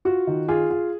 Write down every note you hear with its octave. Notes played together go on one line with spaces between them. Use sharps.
F4 F#4
D#3
F4 G#4
F4